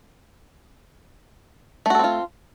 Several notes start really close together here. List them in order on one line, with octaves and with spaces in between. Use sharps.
A3 F#4 A4 C4 F4